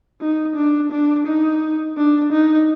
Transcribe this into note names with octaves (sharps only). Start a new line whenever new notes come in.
D#4
D4
D4
D#4
D4
D#4